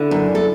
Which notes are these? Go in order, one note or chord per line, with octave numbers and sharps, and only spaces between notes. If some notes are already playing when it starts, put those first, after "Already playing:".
Already playing: D3 E4
F#2
A4